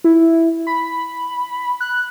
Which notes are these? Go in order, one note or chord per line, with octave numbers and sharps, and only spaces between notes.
E4
B5
F#6